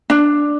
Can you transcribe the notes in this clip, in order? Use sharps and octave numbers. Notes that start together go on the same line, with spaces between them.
D4